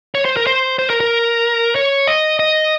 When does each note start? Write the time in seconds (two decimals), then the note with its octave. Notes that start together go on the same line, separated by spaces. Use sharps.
0.15 C#5
0.25 C5
0.37 A#4
0.47 C5
0.79 C5
0.90 A#4
1.00 A#4
1.76 C#5
2.08 D#5
2.40 D#5